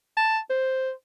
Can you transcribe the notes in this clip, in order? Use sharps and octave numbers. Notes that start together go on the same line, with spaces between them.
A5
C5